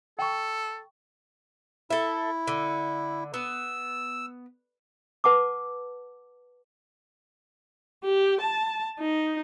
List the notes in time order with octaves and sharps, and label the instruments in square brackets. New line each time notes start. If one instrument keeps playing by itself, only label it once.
[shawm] A4 [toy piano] G5 C#6
[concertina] E4 [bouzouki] A4 E5
[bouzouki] D3
[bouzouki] B3 [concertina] E6
[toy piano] B4 F#5 A5 D6
[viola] G4
A5
D#4